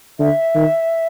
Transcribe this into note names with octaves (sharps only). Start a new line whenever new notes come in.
D3 E5
D#3